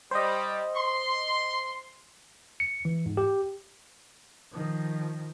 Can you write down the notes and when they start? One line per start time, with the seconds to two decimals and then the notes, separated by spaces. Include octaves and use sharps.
0.11 G3 C5 D#5
0.74 C6
2.60 C#7
2.85 E3
3.06 G#2
3.17 G4
4.51 D#3 F3